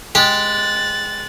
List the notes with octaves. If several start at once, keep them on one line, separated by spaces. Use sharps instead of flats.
G#3 G4 F#6 A6